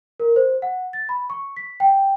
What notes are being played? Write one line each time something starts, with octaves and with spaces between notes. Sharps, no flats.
A#4
C5
F#5
A6
B5
C#6
B6
G5